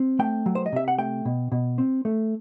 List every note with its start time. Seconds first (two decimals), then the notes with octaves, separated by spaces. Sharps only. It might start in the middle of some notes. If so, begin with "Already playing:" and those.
Already playing: C4
0.19 A3 G5
0.46 F#3
0.55 C5
0.66 D#5
0.72 C3 E5
0.88 F#5
0.98 A3 G5
1.25 B2
1.52 B2
1.78 C4
2.05 A3